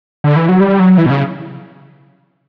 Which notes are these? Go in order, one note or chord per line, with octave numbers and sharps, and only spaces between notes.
D3
E3
F#3
G3
F#3
E3
B2
C#3